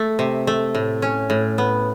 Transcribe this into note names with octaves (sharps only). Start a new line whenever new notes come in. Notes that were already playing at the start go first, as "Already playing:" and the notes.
Already playing: A3
C3
A3
A2
C#4
A2
B3